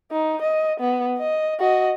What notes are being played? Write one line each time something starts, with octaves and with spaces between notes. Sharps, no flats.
D#4
D#5
B3
D#5
F#4 D#5